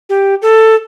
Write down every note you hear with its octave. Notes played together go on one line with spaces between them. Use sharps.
G4
A4